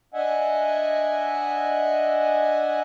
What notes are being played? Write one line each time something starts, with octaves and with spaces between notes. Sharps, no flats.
D4 D#5 E5 F#5 G#5